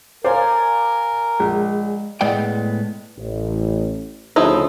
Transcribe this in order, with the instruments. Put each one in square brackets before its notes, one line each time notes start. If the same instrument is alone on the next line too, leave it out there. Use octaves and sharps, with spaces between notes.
[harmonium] A#4 [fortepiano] C5 [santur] D5 F5 G#5
[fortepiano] A#1 [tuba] G#3
[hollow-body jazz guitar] A2 G#3 B3 D5 G5
[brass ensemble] A1
[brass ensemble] D2 C#3 [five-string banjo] F3 D#4 E4